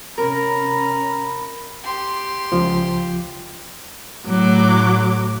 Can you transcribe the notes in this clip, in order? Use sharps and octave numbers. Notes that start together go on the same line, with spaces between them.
C3 C#4 A#4 A#5 B5
G4 C6
C#2 F3
A2 F#3 D6